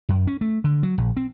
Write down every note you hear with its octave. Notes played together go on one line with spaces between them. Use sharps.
F#2
C#4
A3
D3
F#3
A#1
C4